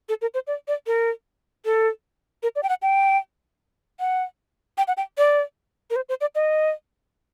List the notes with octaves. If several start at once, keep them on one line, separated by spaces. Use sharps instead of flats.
A4
A#4
C5
D5
D5
A#4
A4
A#4
D5
G5
F#5
G5
F#5
G5
F#5
G5
D5
A#4
C5
C5
D5
D#5